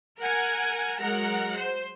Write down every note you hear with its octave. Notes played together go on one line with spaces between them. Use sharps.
A#4 F#5 G#5
F#3 G#3 A#4 F#5 A#5
C5